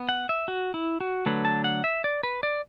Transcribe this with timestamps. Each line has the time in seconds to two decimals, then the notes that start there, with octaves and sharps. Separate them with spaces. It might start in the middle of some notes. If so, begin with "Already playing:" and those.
Already playing: B3
0.09 F#5
0.29 E5
0.48 F#4
0.74 E4
1.01 F#4
1.26 D3 F#3 A3 B4
1.45 A5
1.64 F#5
1.84 E5
2.04 D5
2.23 B4
2.43 D5